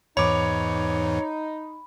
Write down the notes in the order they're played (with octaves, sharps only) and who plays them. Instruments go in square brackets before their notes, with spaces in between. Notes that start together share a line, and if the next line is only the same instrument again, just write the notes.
[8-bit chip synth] E2 G#2 E3 [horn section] D#4 [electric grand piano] C#5 D6 [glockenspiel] B5